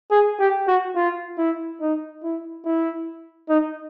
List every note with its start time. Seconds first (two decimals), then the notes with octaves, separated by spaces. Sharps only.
0.11 G#4
0.40 G4
0.67 F#4
0.96 F4
1.38 E4
1.81 D#4
2.23 E4
2.65 E4
3.49 D#4